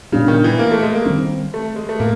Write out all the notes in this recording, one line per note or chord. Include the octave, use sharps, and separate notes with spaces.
A#2 C#3 G3 B3 D4
D#3
E3
A#3
A3
G#3
A#3
D#3 G3 C4
A3
G#3
A3
A2 A#3